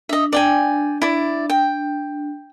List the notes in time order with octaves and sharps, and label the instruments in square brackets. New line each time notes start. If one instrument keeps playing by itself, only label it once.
[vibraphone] D4 [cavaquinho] D#5 E5
[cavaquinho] D5 G5 G#5
E4 D5
G5